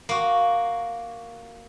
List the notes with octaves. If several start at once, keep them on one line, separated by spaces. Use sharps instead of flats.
A#3 F#4